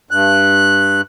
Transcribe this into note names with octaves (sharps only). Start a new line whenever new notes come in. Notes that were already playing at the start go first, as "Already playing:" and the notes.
G2 F#6